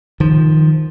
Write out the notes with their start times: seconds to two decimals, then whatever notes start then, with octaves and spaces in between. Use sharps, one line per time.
0.20 D#3 F3